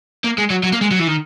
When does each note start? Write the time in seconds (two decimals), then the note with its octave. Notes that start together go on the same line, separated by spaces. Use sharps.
0.24 A#3
0.38 G#3
0.50 F#3
0.63 F#3
0.73 A#3
0.81 G#3
0.91 F#3
0.99 E3
1.07 D#3